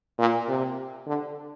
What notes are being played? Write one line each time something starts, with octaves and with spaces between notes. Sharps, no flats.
A#2
C3
D3